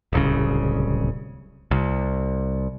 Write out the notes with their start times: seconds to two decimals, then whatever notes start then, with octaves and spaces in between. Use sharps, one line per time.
0.13 D1 C2 C#3
1.71 C2